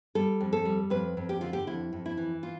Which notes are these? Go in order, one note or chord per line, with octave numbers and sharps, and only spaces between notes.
G3 A4
F2
A4
G3
F2 B4
F2
G4
D3 F4
G4
F2 E4
F2
E4
E3
F4